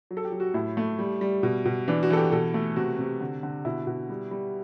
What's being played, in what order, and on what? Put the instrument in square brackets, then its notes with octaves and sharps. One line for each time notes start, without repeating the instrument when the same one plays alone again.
[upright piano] F#3
A4
G4
F#3
F#4
A2 E4
A3
G3
G3
B2
B2
E3 D4
F#4
E3 A4
G4
B2 A4
A3
C3 F#4
C3
D3
D3
B2 E4
B2
G3
G3